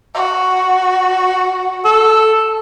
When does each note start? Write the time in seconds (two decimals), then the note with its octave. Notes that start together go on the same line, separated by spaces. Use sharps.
0.14 F#4
1.85 A4